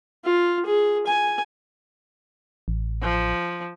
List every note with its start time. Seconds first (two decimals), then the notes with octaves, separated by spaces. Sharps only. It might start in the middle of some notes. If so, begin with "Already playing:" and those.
0.25 F4
0.66 G#4
1.07 G#5
2.68 A1
3.02 F3